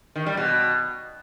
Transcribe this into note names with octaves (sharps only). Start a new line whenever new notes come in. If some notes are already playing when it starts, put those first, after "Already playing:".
D#3
G3
B2